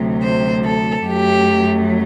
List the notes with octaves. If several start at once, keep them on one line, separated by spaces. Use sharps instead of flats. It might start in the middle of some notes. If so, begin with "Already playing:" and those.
Already playing: D2 C3 F#3
C5
A4
F#2 F#3 A3 G4